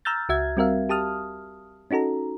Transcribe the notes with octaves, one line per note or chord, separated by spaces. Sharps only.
A#5 E6 F6 G6 A6
C#2 F#4 E5 G#6
G3 C4 F#4 A#4 E5 F5
G4 A5 D#6 F6
C#4 D#4 F#4 A4 A#5